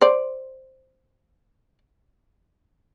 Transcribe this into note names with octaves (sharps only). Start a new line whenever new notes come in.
C5 D5